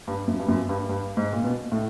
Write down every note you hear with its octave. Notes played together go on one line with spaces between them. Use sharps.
G2
F#2
G2
F#2
G2
G2
G#2
A#2
B2
A2